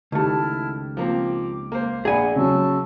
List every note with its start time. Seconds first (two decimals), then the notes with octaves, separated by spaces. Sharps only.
0.12 C#2 D#3 A3 E4 G4 A5 F6
0.97 F3 A#3 C4 D6
1.72 A#3 C5
2.05 A#1 G#4 D5 F#5 G#5 B5
2.36 C#3 F#3 A5 C#6 E6